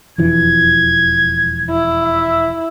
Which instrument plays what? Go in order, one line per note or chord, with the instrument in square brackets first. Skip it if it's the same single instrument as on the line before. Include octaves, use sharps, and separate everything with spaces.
[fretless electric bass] E1 F2 E3 [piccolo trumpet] G#6
[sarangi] E4
[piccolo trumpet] E5